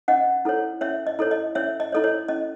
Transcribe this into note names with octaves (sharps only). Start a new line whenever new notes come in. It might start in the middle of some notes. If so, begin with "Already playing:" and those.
C#4 D#5 F#5
E4 A4 C#5
C#4 C#5 E5
D#5
E4 A4 C#5
D#5
C#4 C#5 E5
D#5
E4 A4 C#5 D#5
C#5
C#4 D#5